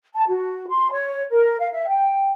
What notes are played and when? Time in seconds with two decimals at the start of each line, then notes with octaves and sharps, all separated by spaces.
0.14 A5
0.28 F#4
0.69 C6
0.92 C#5
1.31 A#4
1.60 F5
1.73 E5
1.89 G5